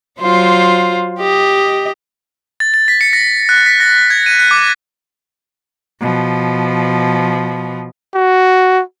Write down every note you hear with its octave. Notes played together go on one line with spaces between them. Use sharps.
F#3 F4 C5
G4 D#5
A6
A6
B6
C#7
A#6
F#6
B6
A#6
G#6
D#7
F#6
D6
B2 F3
F#4